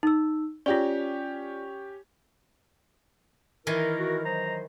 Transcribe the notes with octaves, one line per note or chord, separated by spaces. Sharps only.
D#4 E6
C#4 F4 G4 D5
D#3 E3 E4 A#4 G#5
F#4
F#3 C5 D#5 A#5